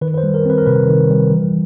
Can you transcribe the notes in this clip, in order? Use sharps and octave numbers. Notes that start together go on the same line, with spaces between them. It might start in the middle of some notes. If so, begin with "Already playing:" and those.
D#3 B4
B4
C5
G3
A#4
C4 B4
A#4
C3 B4
D#3
G3
E3